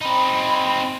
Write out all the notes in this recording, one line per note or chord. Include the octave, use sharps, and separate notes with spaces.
C4 D#4 B5